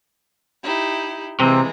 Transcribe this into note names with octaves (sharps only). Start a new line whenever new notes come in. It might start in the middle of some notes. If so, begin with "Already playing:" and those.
D#4 E4 G4
C3 E3 G#3 A#3 C4